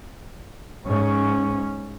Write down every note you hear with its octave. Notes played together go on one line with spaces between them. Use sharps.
G#2 C#4